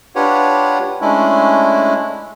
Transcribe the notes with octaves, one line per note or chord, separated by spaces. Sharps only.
D4 F4 G4 B4 C#5 F#5
G#3 A3 C#4 D4 E4